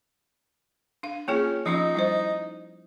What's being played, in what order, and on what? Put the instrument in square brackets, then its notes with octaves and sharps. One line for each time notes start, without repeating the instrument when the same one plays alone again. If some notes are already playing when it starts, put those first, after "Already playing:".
[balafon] D4 F5
[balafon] A#3 F4 G#4 [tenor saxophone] C#4
[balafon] F3 C#4 F4 [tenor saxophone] D#4
[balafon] G3 E4 C5